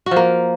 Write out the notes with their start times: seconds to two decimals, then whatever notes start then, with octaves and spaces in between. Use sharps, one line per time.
0.06 F#4
0.11 F3
0.16 A#3